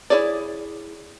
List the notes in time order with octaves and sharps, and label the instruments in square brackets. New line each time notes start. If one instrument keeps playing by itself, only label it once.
[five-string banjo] E4 F#4 G#4 C#5 D5